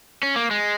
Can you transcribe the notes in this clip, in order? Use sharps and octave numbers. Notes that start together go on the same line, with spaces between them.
C#4
A#3
G#3